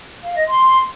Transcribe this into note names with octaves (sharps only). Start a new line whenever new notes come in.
F5
D#5
C6